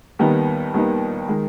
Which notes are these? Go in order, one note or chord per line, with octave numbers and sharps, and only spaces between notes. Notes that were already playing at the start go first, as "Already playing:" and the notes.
D#2 D#3 G3 B3 D#4
D#2 D#3 G3 B3 D#4
D#3 G#3